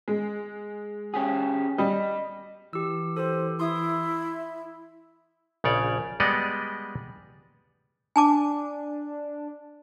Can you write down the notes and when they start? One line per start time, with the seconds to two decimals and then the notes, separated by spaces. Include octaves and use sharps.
0.08 G#3
1.14 C#4 G4 G#4
1.78 G3 D#5
2.73 E3 G4 E6
3.17 G4 A4 C5
3.60 E4 C6 D#6
5.64 A#1 C#3 C#5 D5
6.20 G3 G#3 B3 D5 D#5 F#5
8.16 D4 G#5 A5 D6